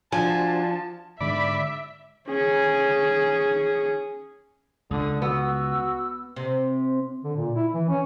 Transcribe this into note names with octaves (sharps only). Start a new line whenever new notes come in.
F3 D4 F#4 C5 G#5 A5
G#2 D3 G#3 D5 E5 B5
C#4 G#4
C#2 D3 D#6
B3 F#4 E6
C3
D3
A#2
E4
E3
C#4